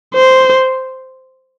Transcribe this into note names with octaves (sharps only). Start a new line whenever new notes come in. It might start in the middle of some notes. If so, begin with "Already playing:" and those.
C5